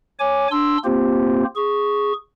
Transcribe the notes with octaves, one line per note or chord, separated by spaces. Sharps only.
C#5 G#5 D6
D4 C6 E6
A#3 C4 F4 G4 C5
G#4 C#6